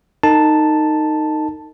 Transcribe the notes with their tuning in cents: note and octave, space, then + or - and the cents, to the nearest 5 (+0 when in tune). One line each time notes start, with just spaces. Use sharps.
D#4 -5 A#4 -45 A5 +0